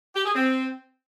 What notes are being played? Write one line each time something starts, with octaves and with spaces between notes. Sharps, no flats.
G4
G#4
C4